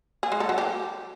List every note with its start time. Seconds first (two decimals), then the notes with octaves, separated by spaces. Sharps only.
0.23 G#4
0.32 G#3
0.40 A4
0.49 F#3
0.58 G4